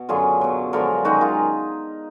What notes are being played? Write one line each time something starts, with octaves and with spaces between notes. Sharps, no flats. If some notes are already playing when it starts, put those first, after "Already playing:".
Already playing: B2
F#2 D3 F#3 F4 G#4
B2 F#3
F#2 D3 F3 G#3 F#4 A#4
F#2 D#3 G#3 D#4 F#4
F4 G#4